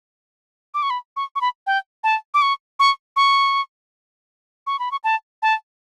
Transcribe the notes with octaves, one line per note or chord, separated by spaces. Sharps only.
D6
C#6
B5
C#6
C#6
B5
G5
A5
D6
C#6
C#6
C#6
C#6
B5
C#6
A5
A5